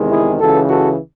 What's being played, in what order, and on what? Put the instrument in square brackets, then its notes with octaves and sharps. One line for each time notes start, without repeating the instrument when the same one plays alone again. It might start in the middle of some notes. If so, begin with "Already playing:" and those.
Already playing: [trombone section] E2 C3 D#3 G#3
E4 G#4
C#2 C#3 E3 F#4 A4
F#4 A4